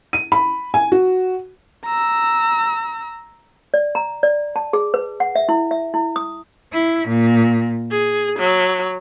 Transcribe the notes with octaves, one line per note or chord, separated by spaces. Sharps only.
D#7
B5
G#5
F#4
A#5 E6
D5
A#5
D5
A5
G#4
B4
F#5
E5
E4
E5
E4
D#6
E4
A#2
G#4
F#3